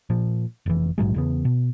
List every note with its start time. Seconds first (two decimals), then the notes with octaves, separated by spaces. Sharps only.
0.10 A#2 F3
0.66 F1 E3
0.98 A#1 G#2 F#3 G#3
1.14 E2 C#3 B3
1.45 B2